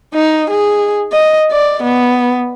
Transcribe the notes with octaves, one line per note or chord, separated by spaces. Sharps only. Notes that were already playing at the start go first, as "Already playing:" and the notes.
D#4
G#4
D#5
D5
B3